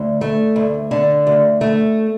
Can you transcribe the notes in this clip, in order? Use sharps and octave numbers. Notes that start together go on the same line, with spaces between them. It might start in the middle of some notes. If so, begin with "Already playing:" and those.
Already playing: D2
A3
D2
D3
D2
A3